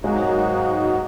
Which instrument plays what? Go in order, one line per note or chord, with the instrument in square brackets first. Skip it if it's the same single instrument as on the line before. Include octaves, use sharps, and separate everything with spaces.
[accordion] G#2 F#3 A#3 D#4 F#4 [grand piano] G#3